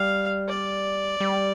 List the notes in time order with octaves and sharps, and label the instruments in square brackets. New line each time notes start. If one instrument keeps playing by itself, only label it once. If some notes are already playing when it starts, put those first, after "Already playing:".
Already playing: [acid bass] G3 [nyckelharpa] F5
[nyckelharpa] D5
[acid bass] G3